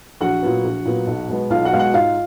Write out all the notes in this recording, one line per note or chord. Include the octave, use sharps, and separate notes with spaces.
A#1 F#4 F#5
A#2 F#3 B3
A#1
A#2 F#3 B3
B1
B2 G#3 B3
B1 F4 F5
F#4 F#5
B2 G#3 B3 F5
F#4 F#5
G#2 F4 F5